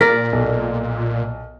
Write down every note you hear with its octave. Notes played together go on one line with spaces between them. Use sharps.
A#2 A#4 D5 B6
B1